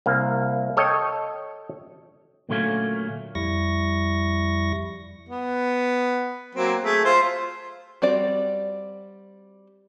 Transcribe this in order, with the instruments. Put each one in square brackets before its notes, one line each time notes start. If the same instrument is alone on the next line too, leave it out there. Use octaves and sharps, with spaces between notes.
[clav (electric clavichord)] C2 A#3
A4 C#5 D#5 G5
[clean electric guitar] A#2 D3 F#3 A3 A#3 C#4
[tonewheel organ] F2 G3 E4 C#6 A#6
[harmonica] B3
F#3 A#3 C4
A3 G#4
F4 C5 C6
[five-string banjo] G3 C4 F#4 D5